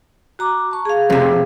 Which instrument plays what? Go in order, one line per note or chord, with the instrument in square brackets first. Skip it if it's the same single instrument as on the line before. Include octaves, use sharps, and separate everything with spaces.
[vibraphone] F#4 A#5 D6
A5 C#6
G#4 F5
[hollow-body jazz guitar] F2 C3